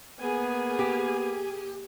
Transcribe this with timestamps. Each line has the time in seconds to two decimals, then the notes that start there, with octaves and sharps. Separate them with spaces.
0.21 A#3 B3 G#4 G#5
0.79 G4